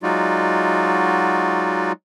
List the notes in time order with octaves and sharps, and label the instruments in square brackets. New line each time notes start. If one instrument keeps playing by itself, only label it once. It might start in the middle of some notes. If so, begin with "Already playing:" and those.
[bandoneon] F#3 G#3 D#4 F4 F#4 D5